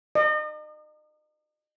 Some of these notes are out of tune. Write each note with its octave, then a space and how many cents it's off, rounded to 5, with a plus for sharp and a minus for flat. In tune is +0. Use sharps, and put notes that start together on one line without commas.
D#5 -40